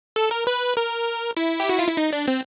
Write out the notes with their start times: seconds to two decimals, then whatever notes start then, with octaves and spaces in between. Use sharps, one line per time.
0.16 A4
0.31 A#4
0.47 B4
0.77 A#4
1.37 E4
1.60 G4
1.69 F#4
1.79 F4
1.88 E4
1.97 D#4
2.13 D4
2.28 C4